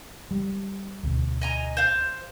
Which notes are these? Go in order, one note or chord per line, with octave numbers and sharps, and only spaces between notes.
G3
D2 B2
D#5 G#5 A#5
C5 F5